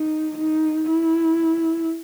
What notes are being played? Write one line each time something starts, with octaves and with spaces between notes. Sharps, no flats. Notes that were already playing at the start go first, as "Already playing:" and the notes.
Already playing: D#4
D#4
E4